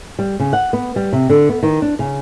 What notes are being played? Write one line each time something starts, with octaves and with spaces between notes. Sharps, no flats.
G3
C#3
F#5
B3
G3
C3
D3
B3
D#3
D4
C#3